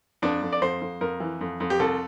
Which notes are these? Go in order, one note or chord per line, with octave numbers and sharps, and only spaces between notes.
F2 D4
F2
D5
F2 C5
F2
F2 A#4
E3
F2
F2
G4
C2 A4